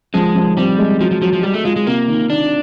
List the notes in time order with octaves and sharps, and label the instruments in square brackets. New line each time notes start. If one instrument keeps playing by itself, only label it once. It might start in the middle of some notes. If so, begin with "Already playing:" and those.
[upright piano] F3 [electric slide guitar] G#3
[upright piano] F3
[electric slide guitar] G3 [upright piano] C4
[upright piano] G#3
[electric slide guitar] F3 [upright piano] F#3
[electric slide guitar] F3
[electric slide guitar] F3 [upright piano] F#3
[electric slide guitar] F3
[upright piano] F#3 [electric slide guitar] G3
[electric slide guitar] A3
[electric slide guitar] G#3 [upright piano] F4
[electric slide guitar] G#3
[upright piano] C3 [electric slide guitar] A#3
[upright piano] D#3
[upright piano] D#3 [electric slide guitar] D4